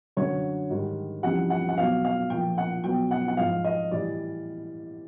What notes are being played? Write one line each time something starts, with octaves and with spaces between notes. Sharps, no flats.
F#2 D3 F#3 C#5
G#2 D#3 G3
F2 C#3 E3 G3 F#5
F#5
F#5
B2 F#3 F5
F5
A#2 F3 G5
F#5
B2 F#3 G5
F#5
F#5
G#2 F3 F5
D#5
A2 E3 G3 D5